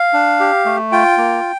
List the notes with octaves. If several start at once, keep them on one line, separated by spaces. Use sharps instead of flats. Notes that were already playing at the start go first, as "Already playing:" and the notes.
Already playing: F5
D4
G4
A3
F4 G5
A#3